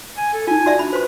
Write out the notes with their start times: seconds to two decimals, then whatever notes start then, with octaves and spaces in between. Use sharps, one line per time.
0.17 G#5
0.33 A4
0.47 D#4 F4 G#5
0.66 F#4 D5 E5
0.79 D4 B5
0.93 B4 C5 C6